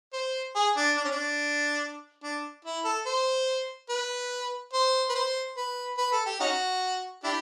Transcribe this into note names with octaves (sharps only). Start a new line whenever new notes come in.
C5
G#4
D4
D4
C#4
D4
D4
E4
A4
C5
B4
C5
B4
C5
B4
B4
A4
G4
C#4 D#4 F#4
D4 E4 G4